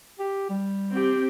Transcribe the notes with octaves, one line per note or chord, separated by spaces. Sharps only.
G4
G3
C4 G4